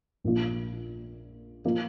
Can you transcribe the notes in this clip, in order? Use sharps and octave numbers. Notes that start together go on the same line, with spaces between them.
A#1 A#2 F3 A#3
F3 A#3